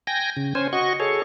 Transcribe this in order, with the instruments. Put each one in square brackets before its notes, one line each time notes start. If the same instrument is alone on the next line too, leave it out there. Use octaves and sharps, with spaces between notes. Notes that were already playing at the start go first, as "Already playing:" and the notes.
[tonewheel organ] G5 G#5 A#6
C#3
C#4 C5 G#5
F#4 D#5 C#6
G#4 A4 C#5